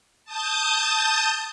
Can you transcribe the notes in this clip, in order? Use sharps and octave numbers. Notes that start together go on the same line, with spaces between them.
A5 D#6 G6 A6